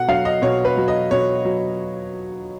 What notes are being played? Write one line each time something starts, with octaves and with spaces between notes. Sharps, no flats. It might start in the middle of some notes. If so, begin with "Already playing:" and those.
Already playing: B2 F#5
F#3 F5
D#5
B2 C#5
B4
F#3
D#5
B2 C#5
F#3